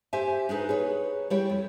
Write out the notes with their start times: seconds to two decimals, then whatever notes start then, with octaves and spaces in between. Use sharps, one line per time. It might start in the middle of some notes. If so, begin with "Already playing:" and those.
0.13 G4 C5 E5 G#5
0.49 D4 D#4 G#4 B4
0.69 G#4 B4 C#5
1.30 G3 E4 G4 C#5
1.49 F2